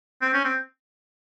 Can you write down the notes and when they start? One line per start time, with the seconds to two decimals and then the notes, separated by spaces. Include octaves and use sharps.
0.22 C4
0.34 C#4
0.45 C4